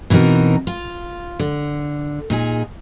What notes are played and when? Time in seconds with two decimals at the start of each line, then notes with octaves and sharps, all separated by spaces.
0.10 B2 E3 C4 D#4 A#4
0.67 F4
1.39 D3
2.30 A#2 D#4 G#4